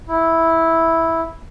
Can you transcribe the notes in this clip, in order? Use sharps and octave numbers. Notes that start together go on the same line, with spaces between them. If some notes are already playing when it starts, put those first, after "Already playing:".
E4